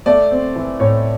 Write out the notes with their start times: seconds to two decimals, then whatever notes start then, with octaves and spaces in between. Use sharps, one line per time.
0.06 A3 D5
0.31 C4
0.56 E3
0.80 A2 C#5